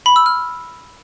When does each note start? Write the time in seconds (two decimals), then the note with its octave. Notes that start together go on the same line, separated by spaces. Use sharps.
0.06 B5
0.16 E6
0.26 F6